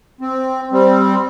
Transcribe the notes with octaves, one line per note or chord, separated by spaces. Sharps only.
C4
G3 C4